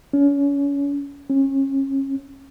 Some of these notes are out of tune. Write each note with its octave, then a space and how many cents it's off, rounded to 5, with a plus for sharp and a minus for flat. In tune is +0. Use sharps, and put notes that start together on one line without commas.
C#4 +30
C#4 -30